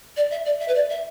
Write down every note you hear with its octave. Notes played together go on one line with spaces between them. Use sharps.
D5
E5
D5
E5
B4
D5
E5